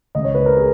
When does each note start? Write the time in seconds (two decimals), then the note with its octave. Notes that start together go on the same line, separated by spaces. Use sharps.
0.15 C#2 C#3 D#5
0.24 C#5
0.35 B4
0.46 A#4
0.56 G#4